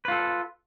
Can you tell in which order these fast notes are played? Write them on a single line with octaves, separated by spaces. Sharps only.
B4 F4 A4